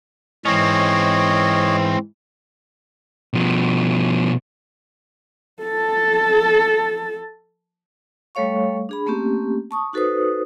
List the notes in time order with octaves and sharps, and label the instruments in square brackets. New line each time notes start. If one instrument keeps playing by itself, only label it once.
[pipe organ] G#2 E3 [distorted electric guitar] C4 C#4 [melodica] C#5 D#5
[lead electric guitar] B2 F3
[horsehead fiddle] A4 A5
[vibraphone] G3 A3 A4 C#5 F5 C#6
D4 G#4 B5
A3 A#3 C4 C#4 G4
A5 C#6 D#6
D#4 F#4 A4 B4 C5 D#6